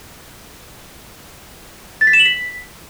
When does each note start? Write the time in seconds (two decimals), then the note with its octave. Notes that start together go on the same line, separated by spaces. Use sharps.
2.01 A6
2.07 B6
2.13 E7
2.19 F#7
2.26 B6